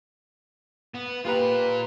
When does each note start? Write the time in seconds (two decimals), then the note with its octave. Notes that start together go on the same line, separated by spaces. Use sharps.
0.95 B3
1.25 A#3 F4 G4 B4 A#5